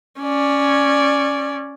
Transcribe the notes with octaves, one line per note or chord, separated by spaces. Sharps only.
C#4 D5